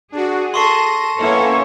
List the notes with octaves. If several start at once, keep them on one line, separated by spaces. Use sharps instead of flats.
D4 F#4 G#4
A4 C6 C#6 A#6 C7 D#7
A#3 B3 C#4 E4 A4 C#5